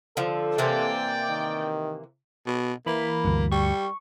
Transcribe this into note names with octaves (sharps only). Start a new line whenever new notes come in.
D3 F3 A4
C3 E3 A#3 D5 G5
D#3
B2
E3 A#3 B5
D2 G2
G3 C#6